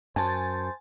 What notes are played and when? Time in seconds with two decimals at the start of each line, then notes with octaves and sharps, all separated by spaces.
0.16 F#2 C5 G#5 A5 A6